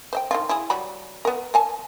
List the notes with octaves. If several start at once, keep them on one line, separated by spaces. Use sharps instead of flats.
C5 E5 G5
D#3 F3 F4
E4 G#4
F#3 G3 B5
B3 A#4
A#4 G#5 A5